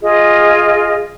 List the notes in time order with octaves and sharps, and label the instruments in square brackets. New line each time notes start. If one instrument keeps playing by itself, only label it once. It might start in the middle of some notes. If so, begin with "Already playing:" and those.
[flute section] F4 G#4 D#5